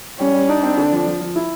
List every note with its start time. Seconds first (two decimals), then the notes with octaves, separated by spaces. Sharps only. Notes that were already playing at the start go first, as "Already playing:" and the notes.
0.19 G3 C#4
0.34 G3
0.49 D4 D#4
0.63 C4
0.78 D3
0.92 F3
1.06 F3
1.21 F3
1.36 E4